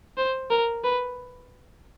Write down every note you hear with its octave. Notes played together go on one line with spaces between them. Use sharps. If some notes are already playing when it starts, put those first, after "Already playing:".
C5
A#4
B4